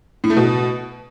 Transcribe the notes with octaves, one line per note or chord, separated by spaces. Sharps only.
A2
A3
B2